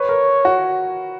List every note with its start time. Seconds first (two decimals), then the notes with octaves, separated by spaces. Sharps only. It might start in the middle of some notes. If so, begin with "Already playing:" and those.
Already playing: B4 C#5
0.09 A#4
0.45 F#4